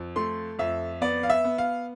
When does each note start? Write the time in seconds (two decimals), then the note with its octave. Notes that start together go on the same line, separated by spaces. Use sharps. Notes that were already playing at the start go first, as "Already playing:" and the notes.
Already playing: F2
0.16 A3 C6
0.59 F2 E5
1.01 B3 D5
1.23 F5
1.30 E5
1.44 B3
1.58 F5